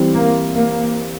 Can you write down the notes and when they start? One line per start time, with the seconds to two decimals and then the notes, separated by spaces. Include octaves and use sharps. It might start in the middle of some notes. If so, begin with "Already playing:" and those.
Already playing: E3 G3 C4 E4 G4
0.14 A#3
0.55 A#3